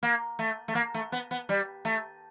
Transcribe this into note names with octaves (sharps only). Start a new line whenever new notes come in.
A#3
A3
A3
A#3
A3
B3
B3
G3
A3